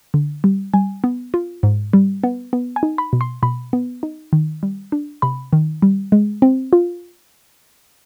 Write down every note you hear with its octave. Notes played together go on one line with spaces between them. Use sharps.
D3
G3
G3 G#5
B3
F4
G#2
G3
B3
B3
G#5
D#4
B5
B2
C6
B2 B5
B3
D#4
D#3
G3
D4
C3 B5
D#3
G3
G#3
C4
F4